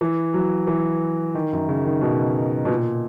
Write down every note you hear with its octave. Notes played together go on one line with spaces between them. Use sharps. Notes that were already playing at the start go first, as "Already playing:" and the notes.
E3
F#3
E3
D#3
F#2
C#3
D#3
B2
B2
A#2